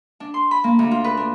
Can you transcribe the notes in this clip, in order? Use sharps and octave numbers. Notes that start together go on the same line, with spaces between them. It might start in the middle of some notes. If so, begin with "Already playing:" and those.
D4
C6
B5
A#3
D2
F4
B4
D4